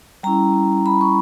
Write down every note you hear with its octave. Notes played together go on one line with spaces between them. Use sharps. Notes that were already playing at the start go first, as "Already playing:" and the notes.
G3 C#4 E4 A#5
B5
C#6